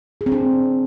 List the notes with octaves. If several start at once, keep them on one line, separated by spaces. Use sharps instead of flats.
G#4
C4
D4